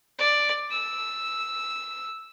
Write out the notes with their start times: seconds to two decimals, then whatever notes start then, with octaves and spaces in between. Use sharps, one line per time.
0.19 D5
0.71 E6